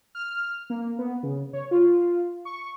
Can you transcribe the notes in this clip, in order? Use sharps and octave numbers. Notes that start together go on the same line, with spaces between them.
F6
A#3
B3
C#3
C#5
F4
C#6